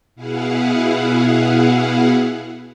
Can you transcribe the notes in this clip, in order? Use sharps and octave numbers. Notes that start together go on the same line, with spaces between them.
B2 E4 G#4 F5 F#5